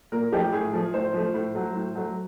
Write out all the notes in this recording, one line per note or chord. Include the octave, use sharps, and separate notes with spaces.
A#2 A#4
F3 A3 G4
A2 G#4
F3 A3
A2 C5
F3 A3
A2
F#3 A3
A2
F#3 A3